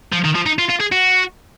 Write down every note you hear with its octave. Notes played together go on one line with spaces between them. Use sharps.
F3
D#3
F3
D#4
F4
F4
G#4
F#4